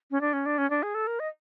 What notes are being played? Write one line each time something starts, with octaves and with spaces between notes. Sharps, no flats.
C#4
D4
C#4
D4
C#4
D4
G#4
A4
A#4
D#5